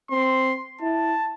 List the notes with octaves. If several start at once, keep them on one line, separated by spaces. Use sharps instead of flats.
C4 C6
E4 A5